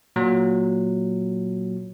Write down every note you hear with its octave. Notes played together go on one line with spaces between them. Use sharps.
A#2 F#3